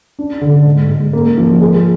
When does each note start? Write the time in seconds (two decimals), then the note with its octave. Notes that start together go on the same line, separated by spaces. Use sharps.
0.19 D4
0.41 D3
0.65 G#2
0.89 G#2
1.13 A#3
1.38 F3
1.61 G#3